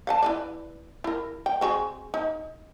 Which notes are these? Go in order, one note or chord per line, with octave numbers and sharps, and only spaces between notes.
F5 F#5 A5
E4 B4 D5
E4 A#4
G5
C4 F#4 G#4
D#4